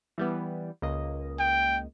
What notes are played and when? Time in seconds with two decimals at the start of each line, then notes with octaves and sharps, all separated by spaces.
0.18 E3 G3 B3
0.82 C#2 A#3 D#5
1.40 G5